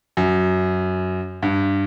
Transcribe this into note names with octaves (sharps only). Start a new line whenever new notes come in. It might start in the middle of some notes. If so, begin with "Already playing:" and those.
F#2
G2